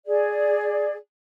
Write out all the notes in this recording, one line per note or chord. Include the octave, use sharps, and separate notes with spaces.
G#4 D5